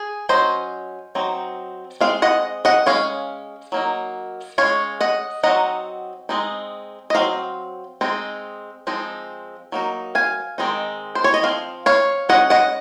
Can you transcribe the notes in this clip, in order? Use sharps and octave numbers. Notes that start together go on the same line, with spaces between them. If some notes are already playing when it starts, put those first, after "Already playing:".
Already playing: G#4
F#3 C#4 C5 D#5
F#3 C4 D#4
G#3 C4 F5
D#5 F#5
D#5 F#5
G#3 C#4 C#5 F5
F#3 A#3 D#4
G#3 C#4 C#5 F5
D#5 F#5
F#3 C4 D#4 D#5 F#5
G#3 C4 D#4
D#5
F#3 C4 F5
G#3 C4 D#4
F3 G#3 C4 D#4
F#3 A#3 D#4
F5 G#5
D#3 G#3 C4 D#4
C5
C#5
D#5
F3 C4 F5
C#5 F5
G#3 C#4 D#5 F#5
D#5 F#5